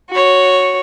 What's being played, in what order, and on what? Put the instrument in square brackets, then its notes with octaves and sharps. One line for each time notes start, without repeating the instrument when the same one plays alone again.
[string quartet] F#4 C#5